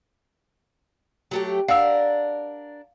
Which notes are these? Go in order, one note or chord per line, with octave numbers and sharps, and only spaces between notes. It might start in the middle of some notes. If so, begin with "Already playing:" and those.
F#3 A3 G4
D4 A#4 F5 F#5 E6